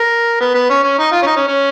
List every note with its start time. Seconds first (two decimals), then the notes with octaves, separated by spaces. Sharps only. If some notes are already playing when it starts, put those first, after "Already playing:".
Already playing: A#4
0.40 B3
0.54 B3
0.70 C#4
0.83 C#4
0.98 D#4
1.12 F4
1.22 C#4
1.26 D#4
1.36 C#4
1.47 C#4